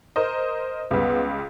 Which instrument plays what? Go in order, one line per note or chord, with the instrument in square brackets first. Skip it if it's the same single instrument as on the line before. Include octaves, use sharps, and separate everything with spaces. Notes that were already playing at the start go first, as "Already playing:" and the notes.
[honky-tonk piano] A#4 C5 D#5
[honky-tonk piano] C#2 G3 [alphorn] B3